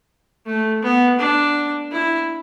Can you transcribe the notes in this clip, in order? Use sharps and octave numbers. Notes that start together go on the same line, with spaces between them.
A3
B3
D4
E4